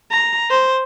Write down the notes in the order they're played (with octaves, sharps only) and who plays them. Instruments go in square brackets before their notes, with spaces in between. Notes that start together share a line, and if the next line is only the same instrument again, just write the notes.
[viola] A#5
C5